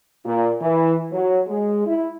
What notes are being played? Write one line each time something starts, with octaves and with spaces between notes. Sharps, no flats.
A#2
E3
F#3
G#3
E4